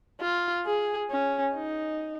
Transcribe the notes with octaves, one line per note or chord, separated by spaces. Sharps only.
F4
G#4
C#4
D#4